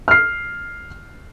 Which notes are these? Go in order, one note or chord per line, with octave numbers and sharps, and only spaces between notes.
F6 C7